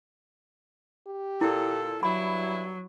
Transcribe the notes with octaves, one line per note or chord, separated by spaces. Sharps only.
G4
A#2 E4 A4
G2 F#3 E4 B5